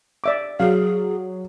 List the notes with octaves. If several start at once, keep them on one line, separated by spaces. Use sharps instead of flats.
D5 E5 D6
F#3 G#4 F5